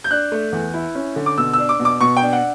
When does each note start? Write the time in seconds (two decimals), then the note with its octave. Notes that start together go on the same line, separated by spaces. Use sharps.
0.04 G6
0.11 D4 F#6
0.32 A3
0.52 E2
0.74 E4
0.95 C#4
1.16 D3
1.26 D6
1.38 B2 E6
1.53 D4 E6
1.69 D6
1.80 B2
1.85 D6
2.01 B2 C#6
2.17 G5
2.22 D4
2.33 F#5